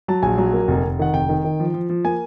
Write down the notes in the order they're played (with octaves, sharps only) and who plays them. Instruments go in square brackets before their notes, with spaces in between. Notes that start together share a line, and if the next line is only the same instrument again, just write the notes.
[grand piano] F#3 A5
A#1 G#5
F#3
A#3
F1
F1
D#3 F#5
F1 G5
D#3
D#3
F3
F3
F3
A#3 G#5